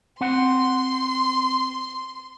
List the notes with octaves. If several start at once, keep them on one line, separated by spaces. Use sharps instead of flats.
C4 F#5 C6